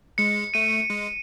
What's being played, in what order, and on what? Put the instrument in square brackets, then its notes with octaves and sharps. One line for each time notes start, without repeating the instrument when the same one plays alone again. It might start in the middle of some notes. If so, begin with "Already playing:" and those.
[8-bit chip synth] G#3 [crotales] C#7
[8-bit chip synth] A3 [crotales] D#7
[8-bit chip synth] G#3